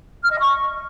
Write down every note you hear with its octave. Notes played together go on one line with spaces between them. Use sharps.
F6
D#5
C#6